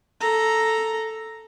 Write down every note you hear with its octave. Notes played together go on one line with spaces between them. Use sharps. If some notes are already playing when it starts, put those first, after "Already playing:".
A4 A#5